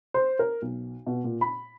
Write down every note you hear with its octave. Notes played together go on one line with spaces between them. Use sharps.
C5
A#4
B1
B2
A#2
B5